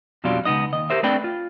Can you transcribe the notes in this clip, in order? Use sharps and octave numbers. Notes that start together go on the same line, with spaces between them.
F2 B2 F#3 G3 D4 F4
C#2 A#2 B3 D#4 D#5
D#2 D#5
G4 A#4 C5 E5
A3 C4 D4 B4 D5 G5
F4